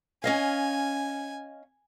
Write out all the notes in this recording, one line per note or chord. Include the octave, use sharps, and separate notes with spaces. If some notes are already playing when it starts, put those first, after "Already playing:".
C#4 D#5 F5 G#5